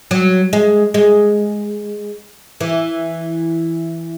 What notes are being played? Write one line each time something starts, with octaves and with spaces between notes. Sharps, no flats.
F#3
G#3
G#3
E3